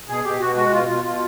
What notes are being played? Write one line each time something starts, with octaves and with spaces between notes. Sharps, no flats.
B2 G#4
B2 G4
B2 F#4
G#3 F#4
B2 F4
B2 F4
B2 F4